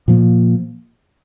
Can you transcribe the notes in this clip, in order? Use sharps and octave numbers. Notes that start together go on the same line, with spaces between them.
A#2 F3 A#3